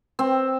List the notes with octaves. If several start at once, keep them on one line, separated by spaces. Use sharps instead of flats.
C4